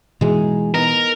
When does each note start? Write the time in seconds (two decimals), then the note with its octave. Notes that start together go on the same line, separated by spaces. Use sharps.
0.21 B2 E3 G#3 D#4 G#4
0.74 B3 D#4 A#4